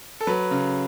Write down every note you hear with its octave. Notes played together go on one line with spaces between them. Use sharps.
A4
F#3 B4
C#3